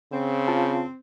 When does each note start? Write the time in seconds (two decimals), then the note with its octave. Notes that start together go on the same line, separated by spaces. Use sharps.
0.12 C#3 C4
0.48 F4 F5 A5